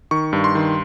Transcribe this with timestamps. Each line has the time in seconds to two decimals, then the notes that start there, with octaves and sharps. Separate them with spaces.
0.11 D#3 C#6
0.33 G2
0.44 C6
0.55 D#3